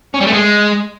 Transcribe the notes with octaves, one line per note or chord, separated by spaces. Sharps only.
C#4
G3
A3
G#3